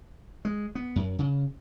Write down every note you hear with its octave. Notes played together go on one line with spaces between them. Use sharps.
G#3
B3
F#2
C#3